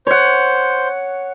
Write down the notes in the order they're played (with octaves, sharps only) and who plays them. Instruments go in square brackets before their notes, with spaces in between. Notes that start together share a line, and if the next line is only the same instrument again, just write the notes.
[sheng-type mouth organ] C5 [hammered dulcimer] C#5 F#5